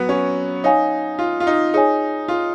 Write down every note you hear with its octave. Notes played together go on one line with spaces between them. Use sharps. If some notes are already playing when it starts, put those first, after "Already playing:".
Already playing: F#3 B3 B4
C#4
D#4 C#5 F5 G#5
F4
F4
D#4
D#4 G#4 C#5 G#5
F4